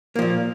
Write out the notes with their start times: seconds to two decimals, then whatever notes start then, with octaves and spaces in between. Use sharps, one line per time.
0.15 A#3
0.19 F3
0.22 A#2